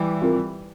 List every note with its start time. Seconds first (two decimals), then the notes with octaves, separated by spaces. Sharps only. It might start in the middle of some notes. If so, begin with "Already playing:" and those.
Already playing: E3 G3
0.22 C4 F4 A#4